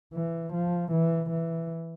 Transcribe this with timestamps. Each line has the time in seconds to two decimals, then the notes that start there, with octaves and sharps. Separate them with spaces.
0.14 E3
0.53 F3
0.91 E3
1.30 E3